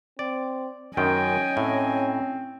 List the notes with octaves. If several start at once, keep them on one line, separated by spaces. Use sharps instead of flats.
C4 D5
F#2 D#3 C#4 D#5 G5 G#5
A2 C4